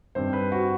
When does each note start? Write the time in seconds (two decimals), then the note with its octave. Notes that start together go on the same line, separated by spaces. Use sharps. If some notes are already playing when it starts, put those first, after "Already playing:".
0.15 G2 D#3 G3 C4 C5
0.33 B4
0.52 F#4